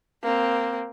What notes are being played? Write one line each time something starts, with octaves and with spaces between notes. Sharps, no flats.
A#3 C4